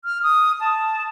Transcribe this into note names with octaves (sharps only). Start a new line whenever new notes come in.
F6
D#6
A5